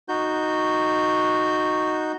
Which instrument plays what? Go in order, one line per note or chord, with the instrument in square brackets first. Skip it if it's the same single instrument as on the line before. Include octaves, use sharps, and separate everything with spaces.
[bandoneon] D#4 F#4 G6